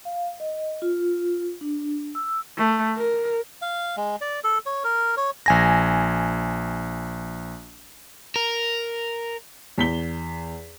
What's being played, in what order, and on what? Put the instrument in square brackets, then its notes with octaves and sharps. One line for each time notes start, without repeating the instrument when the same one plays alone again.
[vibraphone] F5
D#5
F4
D4
E6
[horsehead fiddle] A3
A#4
[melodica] F5
G#3
D5
A4
C#5
A#4
C#5
[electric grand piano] A#1 G#5 A#6
[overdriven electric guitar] A#4
[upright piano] E2 B6 G7